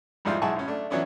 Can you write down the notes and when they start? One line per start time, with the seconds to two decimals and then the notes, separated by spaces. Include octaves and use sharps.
0.25 F2 G#2 G3 E4 F4
0.42 B1 G#3 E4 G#5 A5 C#6
0.56 G#1 C#4
0.68 A3 D4
0.90 E3 F#3 B3 C#4 D4 E4